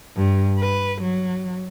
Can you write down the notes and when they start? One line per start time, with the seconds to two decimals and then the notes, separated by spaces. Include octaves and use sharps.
0.17 G2
0.59 B4
1.02 F#3